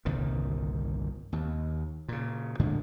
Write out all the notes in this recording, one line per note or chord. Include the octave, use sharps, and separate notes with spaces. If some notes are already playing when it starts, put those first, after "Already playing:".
G1 C2 A#2 D#3
D#2
A#2 C#3
A2 D3 D#3 G#3